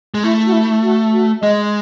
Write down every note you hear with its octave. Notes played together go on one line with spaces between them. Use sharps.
G#3
A3 E4
F#4
E4
F#4
F#4
G#3 D#5